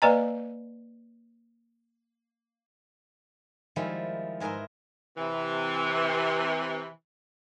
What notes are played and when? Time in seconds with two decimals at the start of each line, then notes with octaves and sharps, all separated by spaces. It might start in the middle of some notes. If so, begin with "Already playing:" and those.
0.02 A#3 B4 D5 D#5 G#5 A#5
3.76 D#3 F3 G3 G#3 E4
4.40 G#2 G#4 A#4 B4 E5 C6
5.17 C3 E3